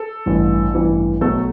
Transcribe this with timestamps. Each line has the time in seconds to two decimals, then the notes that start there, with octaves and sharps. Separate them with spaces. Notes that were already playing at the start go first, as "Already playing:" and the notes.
Already playing: A4
0.26 A1 G2 E3 G3
0.74 A1 G2 E3 G3
1.21 B1 B2 F#3 A3 A4